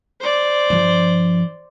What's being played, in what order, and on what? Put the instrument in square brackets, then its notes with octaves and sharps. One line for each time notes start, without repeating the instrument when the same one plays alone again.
[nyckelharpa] C5 D5
[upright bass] G2 F3